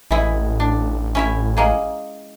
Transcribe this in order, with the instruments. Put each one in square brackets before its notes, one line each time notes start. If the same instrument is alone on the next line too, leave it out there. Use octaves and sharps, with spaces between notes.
[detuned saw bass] A1 [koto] E3 G#3 E4
[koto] D4
C#4 E4 E5
G#3 A#3 G#4